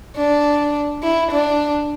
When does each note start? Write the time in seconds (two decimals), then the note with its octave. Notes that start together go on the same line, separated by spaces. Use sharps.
0.16 D4
1.03 E4
1.31 D4